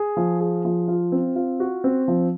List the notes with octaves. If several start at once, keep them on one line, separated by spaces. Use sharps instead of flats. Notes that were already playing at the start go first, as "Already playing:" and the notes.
Already playing: G#4
F3
G#4
F3
F4
C4
F4
F#4
C4
F3